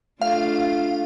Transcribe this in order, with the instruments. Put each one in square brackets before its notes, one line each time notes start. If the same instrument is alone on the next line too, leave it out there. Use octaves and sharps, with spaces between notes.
[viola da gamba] A3 D4 F4 [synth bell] F5